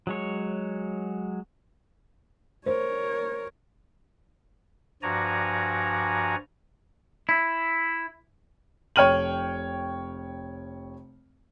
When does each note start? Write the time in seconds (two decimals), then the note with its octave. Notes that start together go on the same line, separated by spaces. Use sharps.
0.07 F#3 G#3 C#5
2.66 A#4 C5 C#5
5.03 G2 F3 F#4 D5 G#5 A#5
7.29 E4
8.96 F1 C#5 G5 F6 D#7 F#7